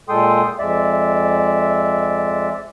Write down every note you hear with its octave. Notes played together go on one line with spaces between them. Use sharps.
A#2 G#3 A4 G5 C6 D#6
F2 G#3 D5 E5